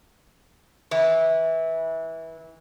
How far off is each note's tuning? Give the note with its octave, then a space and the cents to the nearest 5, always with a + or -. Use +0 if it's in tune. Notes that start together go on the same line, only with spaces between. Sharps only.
E3 -20